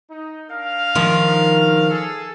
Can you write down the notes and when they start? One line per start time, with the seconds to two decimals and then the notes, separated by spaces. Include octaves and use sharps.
0.10 D#4
0.50 D4 A#4 F5
0.95 D#3 F3
1.90 G#4 A4